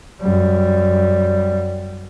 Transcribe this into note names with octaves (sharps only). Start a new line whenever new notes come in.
F#2 G3